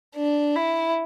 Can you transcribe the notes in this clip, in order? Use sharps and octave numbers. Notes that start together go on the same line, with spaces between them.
D4
E4